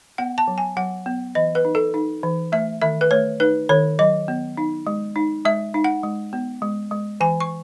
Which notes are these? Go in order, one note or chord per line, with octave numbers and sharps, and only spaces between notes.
B3 F#5
A5
F#3
G#5
F#3 F#5
B3
E3 D#5
B4
D#4
A4
D#4
E3
A3 E5
D#3 E5
B4
A3 C#5
D#4 B4
D#3 C#5
F#3 D#5
B3
D#4
G#3
D#4
G#3 E5
D#4
F#5
G#3
B3
G#3
G#3
E3 G#5
C#6